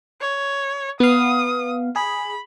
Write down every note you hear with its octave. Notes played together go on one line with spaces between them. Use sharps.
C#5
B3 F5 D#6
G#4 B5